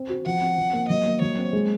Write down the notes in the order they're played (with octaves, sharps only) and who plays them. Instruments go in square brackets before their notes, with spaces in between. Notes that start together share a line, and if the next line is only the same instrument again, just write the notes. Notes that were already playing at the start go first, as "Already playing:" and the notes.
Already playing: [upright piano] C4
F#4
[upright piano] F3 [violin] F#5
[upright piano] C4
F3
A#3
[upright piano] F#3 [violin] D#5
[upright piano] A#3
[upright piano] F#3 [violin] C#5
[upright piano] C4
G#3